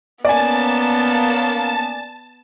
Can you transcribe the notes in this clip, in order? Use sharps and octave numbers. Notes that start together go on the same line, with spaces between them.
A#3 B3 C#4 D5 G#5 A5